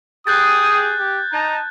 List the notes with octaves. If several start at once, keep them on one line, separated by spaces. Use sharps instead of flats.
G4 G#4 D#6 F#6 G6 A6
G4
D#4 A5 A#5